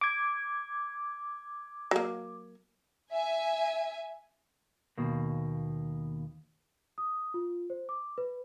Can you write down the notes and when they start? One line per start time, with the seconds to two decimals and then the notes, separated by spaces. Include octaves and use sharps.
0.01 D6 G#6
1.91 F#3 A#3
3.12 E5 G#5
4.98 D#2 B2 A#3
6.98 D#6
7.34 F4
7.70 C5
7.89 D6
8.18 B4